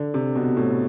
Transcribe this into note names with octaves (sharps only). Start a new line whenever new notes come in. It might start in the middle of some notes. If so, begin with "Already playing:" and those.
Already playing: D3
C3
B2
A2